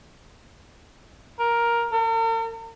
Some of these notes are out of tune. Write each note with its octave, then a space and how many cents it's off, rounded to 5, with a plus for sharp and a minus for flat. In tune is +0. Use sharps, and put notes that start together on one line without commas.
A#4 +10
A#4 -45